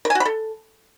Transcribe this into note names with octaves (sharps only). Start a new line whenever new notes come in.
A#4
G#5
F#4
B5
A4